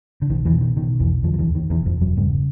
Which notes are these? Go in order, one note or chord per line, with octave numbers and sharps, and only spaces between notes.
D3
B1 D#3
E2 E3
B2
D#3
B2 D#3
B1 E2 E3
F2 D3 F3
F3
E2 E3
D#2
D#3
E1 E2 E3
F2 F3
E1
F#2 F#3
G2 C#3 G3